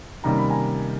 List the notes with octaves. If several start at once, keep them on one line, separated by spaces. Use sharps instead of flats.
C3 D#3 G3 A#3 C#4 A#5
B5
G#5 A#5